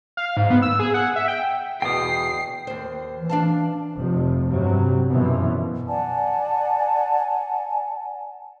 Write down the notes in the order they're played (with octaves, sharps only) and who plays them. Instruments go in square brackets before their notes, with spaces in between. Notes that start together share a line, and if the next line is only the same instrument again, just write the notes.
[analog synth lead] F5
G#2
B3
E6
G#4
F#5
E5
G5
[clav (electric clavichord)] E2 B2 [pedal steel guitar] G5 D#6 [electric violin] C7
[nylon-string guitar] D#2 C5
[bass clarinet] E3
[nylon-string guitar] D4 F5 A5
[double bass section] F1 C3 F3
G2 C3 F#3
F#2 B2 E3 F3
[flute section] D5 F#5 G#5 A5